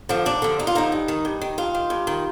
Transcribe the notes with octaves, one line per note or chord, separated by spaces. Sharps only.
D3 F3
D#2 D4
D3 F3
D#2 D#4
F4
D3 F3 D#4
G2
D#3
G2
D#3
G2 F4
D#3
G2
D#3